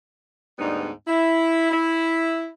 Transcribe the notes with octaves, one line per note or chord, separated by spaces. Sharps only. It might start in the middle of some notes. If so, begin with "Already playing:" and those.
D2 G#2 G3 B3 D4 D#4
E4
E4